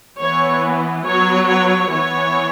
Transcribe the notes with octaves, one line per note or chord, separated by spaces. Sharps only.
E3 B3 C#5
F#3 B3 C#5
C#5
E3 B3 C#5